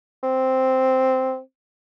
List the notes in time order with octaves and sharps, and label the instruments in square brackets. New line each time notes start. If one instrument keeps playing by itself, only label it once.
[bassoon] C4